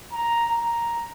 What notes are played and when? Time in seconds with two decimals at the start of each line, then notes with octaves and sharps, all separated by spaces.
0.13 A#5
0.50 A#5